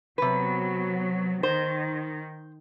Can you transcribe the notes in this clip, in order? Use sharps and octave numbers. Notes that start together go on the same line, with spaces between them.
C3 F#3 B3 B4
D#3 C5